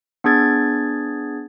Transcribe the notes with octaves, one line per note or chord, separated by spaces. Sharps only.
B3 D4 G#4 G#6 A6